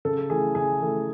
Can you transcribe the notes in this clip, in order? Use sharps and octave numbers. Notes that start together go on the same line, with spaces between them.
C#3 A4
E3 A3 G#4
C#3 G#4
E3 A3